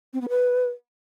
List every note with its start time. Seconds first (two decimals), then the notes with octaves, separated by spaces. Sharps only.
0.13 C4
0.21 B3
0.29 B4